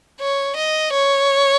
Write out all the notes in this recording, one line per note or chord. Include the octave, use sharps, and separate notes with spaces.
C#5
D#5
C#5